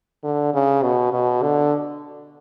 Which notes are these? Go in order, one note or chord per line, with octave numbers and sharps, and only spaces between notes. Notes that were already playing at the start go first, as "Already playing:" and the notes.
D3
C#3
B2
B2
D3